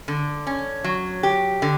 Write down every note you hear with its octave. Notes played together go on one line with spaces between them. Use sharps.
D3
C#4
F#3
G4
D3